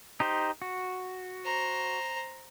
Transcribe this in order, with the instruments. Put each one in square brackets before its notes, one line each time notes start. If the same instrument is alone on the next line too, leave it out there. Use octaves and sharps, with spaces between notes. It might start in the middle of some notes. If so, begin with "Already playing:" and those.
[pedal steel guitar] D#4 G4 C5
F#4
[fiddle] C5 A#5